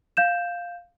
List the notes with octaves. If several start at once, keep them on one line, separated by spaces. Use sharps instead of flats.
F5 G6 E7